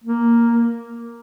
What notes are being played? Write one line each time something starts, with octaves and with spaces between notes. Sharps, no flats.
A#3